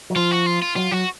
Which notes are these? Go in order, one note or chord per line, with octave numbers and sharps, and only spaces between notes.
F#3
F3 F4
F#4
F4
F4
F#3 F4
F#3 F#4